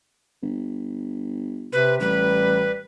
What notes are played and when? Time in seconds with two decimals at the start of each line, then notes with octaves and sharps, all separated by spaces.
0.42 G1
1.73 C3 B4
2.00 A1 G3 B4